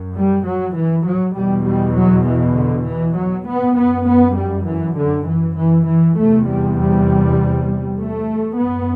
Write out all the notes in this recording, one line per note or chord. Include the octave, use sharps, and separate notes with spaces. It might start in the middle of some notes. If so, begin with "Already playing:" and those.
Already playing: F#2
G3
F#3
E3
F#3
E2 B2 G3
G3
F#3
E3
D3
E3
F#3
B3
F#2 B3
B3
G3
E3
D3
E3
E3
E3
E2 C3 A3
G3
G3
A3
F#2 B3